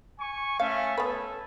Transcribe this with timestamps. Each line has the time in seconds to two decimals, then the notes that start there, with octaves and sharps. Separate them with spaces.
0.20 G#5 C#6
0.60 A3 C#4 F5
0.98 B3 C#4 A4 B4